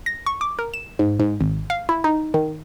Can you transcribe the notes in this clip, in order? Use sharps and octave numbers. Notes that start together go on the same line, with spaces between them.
A#6
C#6
D6
A#4
E7
G#2
G#2
G#1
F5
E4
D#4
D#3